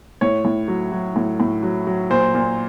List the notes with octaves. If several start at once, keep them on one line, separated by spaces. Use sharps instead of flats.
A2 C#5
A2
F#3
F#3
A2
A2
F#3
F#3
A#2 C5
A#2